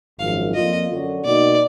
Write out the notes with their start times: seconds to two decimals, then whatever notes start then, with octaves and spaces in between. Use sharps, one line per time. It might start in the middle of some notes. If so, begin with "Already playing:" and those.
0.19 G#1 F#2 F3 F5
0.54 F2 F3 A#3 D4 F4 D#5
0.90 F#2 D3 F#3 D4 F#4
1.25 B2 A#3 D#4 F#4 D5